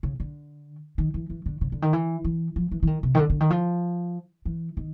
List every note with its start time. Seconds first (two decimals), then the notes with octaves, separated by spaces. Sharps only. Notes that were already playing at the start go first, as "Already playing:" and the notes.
0.03 C#3
0.20 D3
0.98 D#3
1.14 E3
1.30 E3
1.46 D3
1.61 C#3
1.72 D3
1.82 D#3
1.93 E3
2.24 E3
2.56 F3
2.71 E3
2.83 E3
2.87 D#3
3.03 C3
3.15 D#3
3.19 D3
3.30 D3
3.40 D#3
3.50 F3
4.45 E3
4.77 D#3